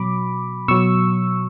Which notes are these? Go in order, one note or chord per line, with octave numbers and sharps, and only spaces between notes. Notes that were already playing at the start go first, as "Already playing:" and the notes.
Already playing: B2 F#3 B5 D6
B2 F#3 C#6 E6